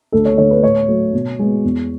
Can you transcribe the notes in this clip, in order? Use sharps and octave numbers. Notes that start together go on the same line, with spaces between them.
D2 A4
C#5
D3 A3 C#5
B4
A2 C#5
F#3 A3
B2
G#3 B3
E2